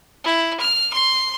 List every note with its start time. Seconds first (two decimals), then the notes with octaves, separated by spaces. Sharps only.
0.24 E4
0.60 F6
0.93 C6